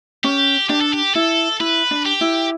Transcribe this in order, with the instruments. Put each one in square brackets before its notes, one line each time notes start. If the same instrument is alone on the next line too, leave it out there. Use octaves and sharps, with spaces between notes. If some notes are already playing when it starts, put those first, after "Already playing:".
[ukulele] C#4 [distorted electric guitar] G4
[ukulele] D4 [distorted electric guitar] G4
[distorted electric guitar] A4
G4
[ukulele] E4 [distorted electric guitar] A4
[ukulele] E4 [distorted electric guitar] B4
[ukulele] D4
[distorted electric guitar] G4
[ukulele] E4